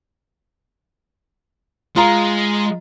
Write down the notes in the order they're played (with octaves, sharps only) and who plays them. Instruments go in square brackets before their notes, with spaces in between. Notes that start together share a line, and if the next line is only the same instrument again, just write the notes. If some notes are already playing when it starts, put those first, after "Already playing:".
[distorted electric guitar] G#3 [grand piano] F4 A#5